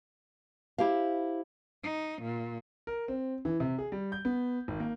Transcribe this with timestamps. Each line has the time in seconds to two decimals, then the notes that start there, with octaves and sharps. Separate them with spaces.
0.78 E4 G4 C5 F5
1.84 D#4
2.22 A#2
2.87 A#4
3.08 C4
3.45 E3
3.60 C3
3.78 G#4
3.92 G3
4.12 G6
4.25 B3
4.68 G#1
4.80 A#3